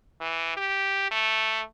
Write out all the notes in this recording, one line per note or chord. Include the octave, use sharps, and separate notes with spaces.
E3
G4
A3